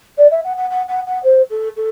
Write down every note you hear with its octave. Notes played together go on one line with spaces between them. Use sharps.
D5
E5
F#5
F#5
F#5
F#5
F#5
C5
A4
A4